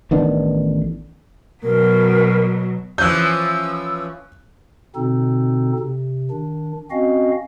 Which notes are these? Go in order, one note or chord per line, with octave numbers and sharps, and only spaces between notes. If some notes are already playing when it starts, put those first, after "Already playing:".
A1 D#3 B3 D4
B2 F#3 A#4
E3 F3 C#4 E6 F#6 G6
B2 D3 C4 D#4 A4
C3
D#3 D4
C4 C#4 F#4 D#5 F5